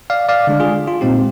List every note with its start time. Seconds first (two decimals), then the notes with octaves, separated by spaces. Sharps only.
0.10 D5 F5
0.29 D5 F5
0.47 D3 G#3 D4
0.60 F4 G#4
0.88 F4
1.01 A#2 G#3 C4 D#4 G4